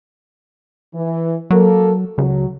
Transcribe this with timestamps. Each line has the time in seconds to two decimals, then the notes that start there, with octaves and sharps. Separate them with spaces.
0.94 E3
1.51 F#3 A#3 A4 A#4
2.18 C#2 F#3